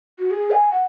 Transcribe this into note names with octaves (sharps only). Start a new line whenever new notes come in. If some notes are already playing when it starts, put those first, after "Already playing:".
F#4
G#4
G#5
F#5